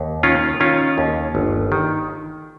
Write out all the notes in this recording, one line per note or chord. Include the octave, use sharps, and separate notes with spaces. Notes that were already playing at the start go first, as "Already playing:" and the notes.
Already playing: D#2
D#3 C#4 F4
D#3 C#4 F4
D#2
G1
D#3